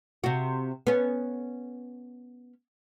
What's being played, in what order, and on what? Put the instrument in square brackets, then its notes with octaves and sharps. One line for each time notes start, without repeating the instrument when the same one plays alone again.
[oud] C3 F#4
B3 C#4